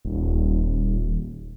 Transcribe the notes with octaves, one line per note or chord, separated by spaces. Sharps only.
D#1